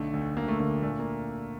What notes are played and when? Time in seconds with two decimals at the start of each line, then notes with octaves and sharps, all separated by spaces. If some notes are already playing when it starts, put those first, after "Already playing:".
Already playing: B1 D3 A3
0.13 D2
0.36 D2 A#3
0.48 A3
0.59 D3 A#3
0.83 A#2 A3
0.99 A#3